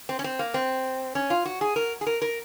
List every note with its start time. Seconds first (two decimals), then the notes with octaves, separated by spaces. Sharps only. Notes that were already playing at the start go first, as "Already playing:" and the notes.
0.09 C4
0.19 C#4
0.24 C4
0.39 A#3
0.54 C4
1.15 C#4
1.30 F4
1.45 F#4
1.61 G#4
1.76 A#4
2.01 G#4
2.07 A#4
2.22 A#4